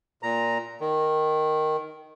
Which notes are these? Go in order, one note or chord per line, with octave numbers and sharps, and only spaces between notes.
A#2 A#5
D#3